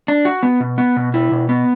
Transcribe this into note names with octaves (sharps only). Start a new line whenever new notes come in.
D4
F#4
B3
B2
B3
B2
E4
B2
B3